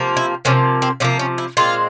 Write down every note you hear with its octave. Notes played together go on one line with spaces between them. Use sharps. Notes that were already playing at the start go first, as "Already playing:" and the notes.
Already playing: C3 F3 A#3
E4
C3 F3 A#3 C#4
C4
C3 F3 A#3 C#4
C#4
E4
A#2 G#3 C4 F4